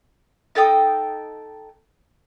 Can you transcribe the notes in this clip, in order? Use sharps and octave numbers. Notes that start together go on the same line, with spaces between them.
D#4 A4 G5 D#6